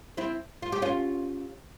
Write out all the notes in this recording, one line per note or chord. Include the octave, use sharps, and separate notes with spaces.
C4 E4
F4
G4
C#4 F4